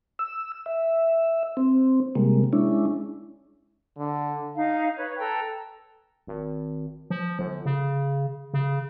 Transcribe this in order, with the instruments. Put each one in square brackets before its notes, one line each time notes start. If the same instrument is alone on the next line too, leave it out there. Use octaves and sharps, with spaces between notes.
[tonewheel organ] E6
E5
C4
C3 G3 G#3 A#3
G#3 C#4 D4 E4
[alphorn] D3
[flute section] D#4 F5
B4 C#5
A4 B4 G5 A#5
[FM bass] G#1
F3
G1
C#3
C#3